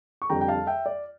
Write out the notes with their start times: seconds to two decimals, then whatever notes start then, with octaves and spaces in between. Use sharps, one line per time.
0.22 C#6
0.30 F2 D3 G3 G5 A#5
0.41 G5
0.48 F5 A5
0.67 E5 G5
0.86 D5